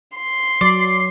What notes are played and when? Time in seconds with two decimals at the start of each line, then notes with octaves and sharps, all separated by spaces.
0.16 C6
0.61 F#3 D5 C7